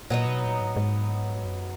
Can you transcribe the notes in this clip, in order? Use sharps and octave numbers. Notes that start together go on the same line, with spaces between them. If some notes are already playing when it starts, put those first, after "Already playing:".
A#2 F#3 B3 D#4
B2
A#2
G#2
A2
G#2
F#2